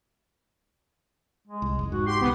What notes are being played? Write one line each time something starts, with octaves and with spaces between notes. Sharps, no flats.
G#3
C2
F1
G#2 F#4
G4 C6
C#2 C3 B3